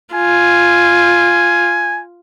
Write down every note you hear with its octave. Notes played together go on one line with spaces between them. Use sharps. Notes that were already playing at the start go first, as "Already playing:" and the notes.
F4 G#5